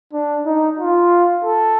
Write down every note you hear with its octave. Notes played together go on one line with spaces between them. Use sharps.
D4
D#4
F4
A4